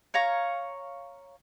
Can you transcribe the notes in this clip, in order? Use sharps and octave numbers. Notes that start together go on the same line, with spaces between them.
C#5 F5 A#5 C#6